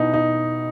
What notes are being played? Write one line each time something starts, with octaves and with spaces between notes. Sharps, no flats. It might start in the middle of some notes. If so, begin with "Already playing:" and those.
Already playing: B2 D#4 E4
D#4